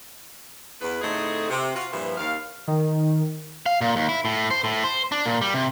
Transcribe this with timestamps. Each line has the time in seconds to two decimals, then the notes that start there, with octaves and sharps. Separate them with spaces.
0.81 E2 B4
1.02 A2 D3 A3 C4 D#4 G#4
1.50 C3
1.75 F4 F#4
1.92 G2 A#2 E3 F3
2.18 D#2 F5
2.68 D#3
3.66 F5
3.81 A#2
3.96 D#2
4.09 E4
4.25 A2
4.51 C5
4.64 A2
4.84 C5
5.12 D4
5.26 A#2
5.41 G3
5.54 C3